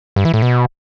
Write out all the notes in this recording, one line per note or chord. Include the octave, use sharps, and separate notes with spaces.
G2
E3
A2
B2